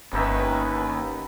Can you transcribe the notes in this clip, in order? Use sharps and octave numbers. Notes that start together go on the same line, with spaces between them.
G1 D#2 B3 C#4 D#4 B4 E5